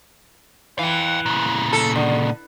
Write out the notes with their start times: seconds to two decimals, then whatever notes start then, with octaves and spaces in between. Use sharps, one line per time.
0.79 E3 F5 G5
1.26 A#2 C#3
1.73 A4
1.96 D3